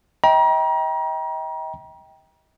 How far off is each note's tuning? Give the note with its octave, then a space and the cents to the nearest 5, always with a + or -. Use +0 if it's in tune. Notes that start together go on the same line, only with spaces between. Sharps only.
D#5 +40 G5 +0 A#5 +35